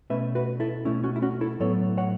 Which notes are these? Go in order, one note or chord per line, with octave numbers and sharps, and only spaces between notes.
B2 A3 C#4 B4 E5
F#4 B4
E4 A4
B2 A3 C#4 E4
C#4 F#4
E4
C#4 F#4
E4 A4
A2 F#3 B3 A4 C#5
C#5 F#5